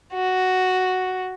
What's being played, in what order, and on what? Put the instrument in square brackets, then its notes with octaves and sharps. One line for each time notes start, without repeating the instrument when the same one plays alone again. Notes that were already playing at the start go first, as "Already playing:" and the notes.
[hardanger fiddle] F#4